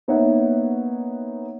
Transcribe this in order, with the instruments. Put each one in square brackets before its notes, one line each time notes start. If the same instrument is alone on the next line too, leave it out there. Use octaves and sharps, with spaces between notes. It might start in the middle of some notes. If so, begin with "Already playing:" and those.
[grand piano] A#3 B3 D#4 C#5 E5 F#5